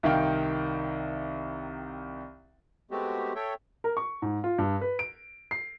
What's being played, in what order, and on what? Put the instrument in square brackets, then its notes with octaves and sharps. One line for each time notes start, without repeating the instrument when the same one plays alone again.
[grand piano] C2 D#3 F5 G5
[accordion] G#3 A3 B3 C4 F#4 G4
A4 C#5 E5 G5
[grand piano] A#4
C#6
G#2
F4
G2
B4
D7
C7